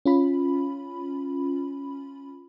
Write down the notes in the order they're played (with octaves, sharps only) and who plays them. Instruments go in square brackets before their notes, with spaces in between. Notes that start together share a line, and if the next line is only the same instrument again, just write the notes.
[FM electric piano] C#4 F4 B5